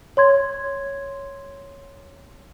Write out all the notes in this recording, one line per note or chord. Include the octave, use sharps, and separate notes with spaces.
C#5 C6 G#6